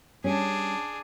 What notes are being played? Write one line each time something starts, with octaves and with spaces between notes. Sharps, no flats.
G3 C#4 D4 G#4